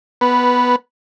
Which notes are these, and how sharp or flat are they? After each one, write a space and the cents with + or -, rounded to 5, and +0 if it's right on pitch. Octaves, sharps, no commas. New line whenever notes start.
B3 +0 B4 -15